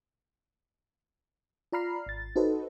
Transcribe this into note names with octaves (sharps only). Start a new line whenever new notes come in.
F4 D5 A#5 B5 F6 C7
G#1 A6
D#4 F#4 A4 B4 C5 D#5